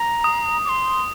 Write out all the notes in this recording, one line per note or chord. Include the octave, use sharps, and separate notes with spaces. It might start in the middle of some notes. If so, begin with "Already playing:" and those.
Already playing: A#5
D#6
D6
C6